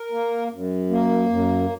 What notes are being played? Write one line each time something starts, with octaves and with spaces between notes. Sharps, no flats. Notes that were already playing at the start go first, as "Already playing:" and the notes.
Already playing: A#4
A#3
F#2
A#3
F#2